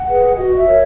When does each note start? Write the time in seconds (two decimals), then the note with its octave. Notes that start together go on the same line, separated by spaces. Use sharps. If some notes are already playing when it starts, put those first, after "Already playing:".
Already playing: F#5
0.09 G#4 B4
0.37 F#4 D#5
0.56 E5
0.66 A#4 C#5